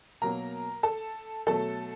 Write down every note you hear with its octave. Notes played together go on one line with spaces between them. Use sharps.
B2 F#3 A#3 A#4 A#5
A4 A5
B2 F#3 A3 A4 A5